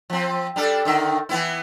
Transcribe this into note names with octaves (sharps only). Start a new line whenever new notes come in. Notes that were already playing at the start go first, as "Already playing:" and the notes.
F3 C4
G3 D4 A4
D3 D#3 E5
E3 B3 E4